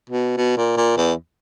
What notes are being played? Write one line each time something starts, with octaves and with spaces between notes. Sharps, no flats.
B2
B2
A#2
A#2
E2